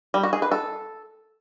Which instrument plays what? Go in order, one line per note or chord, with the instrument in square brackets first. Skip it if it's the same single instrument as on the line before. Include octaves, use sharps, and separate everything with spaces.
[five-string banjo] G3
F#4
G#4
B4
A4